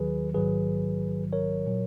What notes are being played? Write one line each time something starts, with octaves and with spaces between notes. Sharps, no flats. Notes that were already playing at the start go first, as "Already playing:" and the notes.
Already playing: D#2 D#3 F#3 G#4 B4
A#1 G#2 D#3 F#3 G#4 B4
A#4 C#5
A#2 F#3